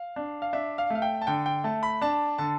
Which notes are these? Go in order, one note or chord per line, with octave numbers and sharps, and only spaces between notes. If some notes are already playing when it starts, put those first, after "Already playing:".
Already playing: F5
D4
F5
D4 E5
F5
A3 F5
G5
A5
D3 G5
G5
A3 A5
B5
D4 A5
D3 A5